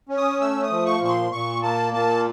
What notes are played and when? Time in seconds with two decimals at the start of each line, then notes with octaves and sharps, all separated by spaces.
0.09 C#4
0.17 D#6
0.41 A3 E6
0.63 D#6
0.71 F3
0.86 C#6
1.01 A#2 C#6
1.09 C6
1.32 A#2 C#6
1.63 A#3 A5
1.94 A#2 A5